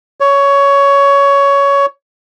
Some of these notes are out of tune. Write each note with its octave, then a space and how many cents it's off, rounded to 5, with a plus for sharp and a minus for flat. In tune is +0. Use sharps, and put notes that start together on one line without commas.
C#5 +15